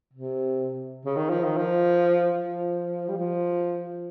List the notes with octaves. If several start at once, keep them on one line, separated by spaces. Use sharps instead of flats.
C3
C#3
D#3
F3
D#3
F3
F3
G3
F3